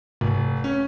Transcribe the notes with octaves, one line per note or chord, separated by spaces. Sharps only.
F1
C#4